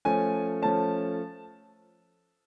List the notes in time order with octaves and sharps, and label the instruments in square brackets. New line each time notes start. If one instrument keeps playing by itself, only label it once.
[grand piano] F3 A3 C#4 G#5
F3 A3 C#4 A5